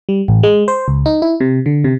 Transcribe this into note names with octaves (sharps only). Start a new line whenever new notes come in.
G3
A1
G#3
C5
C#2
D#4
E4
C3
D3
C3